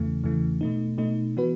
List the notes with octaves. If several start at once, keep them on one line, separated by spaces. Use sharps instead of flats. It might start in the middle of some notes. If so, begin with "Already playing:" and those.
Already playing: E2 C#3 E3 A3
E2 C#3 E3 A3
B2 A3 D#4
B2 A3 D#4
E3 B3 F#4 B4